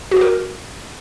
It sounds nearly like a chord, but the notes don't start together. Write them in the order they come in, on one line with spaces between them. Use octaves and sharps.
F#4 G4 A#4